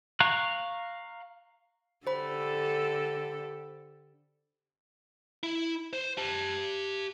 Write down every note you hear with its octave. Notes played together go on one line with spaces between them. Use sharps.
F5 A#5 C#6 F#6
D3 G4 A4 C5 B5
E4
C5
G4 A5